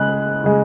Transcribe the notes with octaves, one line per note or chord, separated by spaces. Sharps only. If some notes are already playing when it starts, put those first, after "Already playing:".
Already playing: C#3 G#3 F#6
C#3 G#3